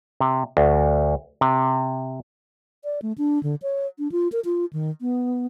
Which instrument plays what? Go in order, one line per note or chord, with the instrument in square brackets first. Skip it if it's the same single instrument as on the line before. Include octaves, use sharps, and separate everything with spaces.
[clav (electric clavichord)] C3
D2
C3
[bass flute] D5
A3
D4
D3
C#5
D4
F4
A#4
F4
D#3
B3